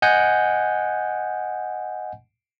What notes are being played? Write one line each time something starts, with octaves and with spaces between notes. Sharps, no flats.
D#5 F#5 G#5 G6